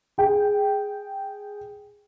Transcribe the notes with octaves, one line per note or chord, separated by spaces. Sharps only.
G#4 G5